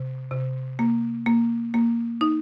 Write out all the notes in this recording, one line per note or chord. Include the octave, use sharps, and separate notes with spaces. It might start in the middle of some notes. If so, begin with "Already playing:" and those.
Already playing: C3
C3
A#3
A#3
A#3
D#4